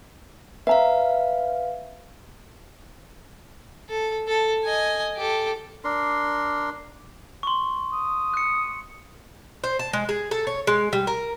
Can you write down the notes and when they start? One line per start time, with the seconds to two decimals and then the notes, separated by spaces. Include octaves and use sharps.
0.67 B4 E5 F5 A#5
3.89 A4
4.28 A4
4.64 D#5 G#5
5.16 G4 A4
5.84 D4 A#4 C6
7.43 C6 C#6
7.92 D#6
8.34 F#6 C#7
9.64 C5
9.79 A5
9.93 G#3
10.09 G#4
10.31 A4
10.47 C#5
10.67 G#3
10.93 G3
11.07 A#4